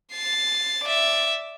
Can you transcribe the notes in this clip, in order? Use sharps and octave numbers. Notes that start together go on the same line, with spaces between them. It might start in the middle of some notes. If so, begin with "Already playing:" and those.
A6 C7
D5 E5